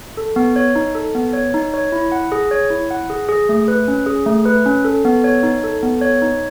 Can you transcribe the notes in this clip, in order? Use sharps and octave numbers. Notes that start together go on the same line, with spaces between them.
A4
B3
C#5
D#4
A4
B3
C#5
D#4
C#5
E4
F#5
G#4
C#5
E4
F#5
G#4
G#4
A3
B4
C#4
G#4
A3
B4
C#4
A4
B3
C#5
D#4
A4
B3
C#5
D#4